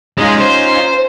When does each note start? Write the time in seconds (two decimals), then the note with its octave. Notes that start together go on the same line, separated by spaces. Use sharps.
0.18 G#3 C#4 D#4 F4
0.40 C5